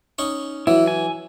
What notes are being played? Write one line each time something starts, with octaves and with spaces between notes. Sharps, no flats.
C#4 D#4 C#6
E3 F#3 E4
G#5